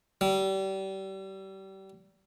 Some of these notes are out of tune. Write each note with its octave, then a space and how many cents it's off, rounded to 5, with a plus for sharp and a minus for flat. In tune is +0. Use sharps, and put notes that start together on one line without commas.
G3 -30